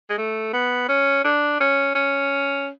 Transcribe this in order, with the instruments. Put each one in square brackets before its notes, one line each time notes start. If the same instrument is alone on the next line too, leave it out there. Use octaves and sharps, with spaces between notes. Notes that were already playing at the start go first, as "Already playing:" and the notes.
[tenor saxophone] G#3
A3
B3
C#4
D4
C#4
C#4